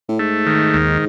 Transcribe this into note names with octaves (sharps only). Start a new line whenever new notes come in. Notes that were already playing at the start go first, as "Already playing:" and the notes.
A2
G#2 A3
D#3
D#2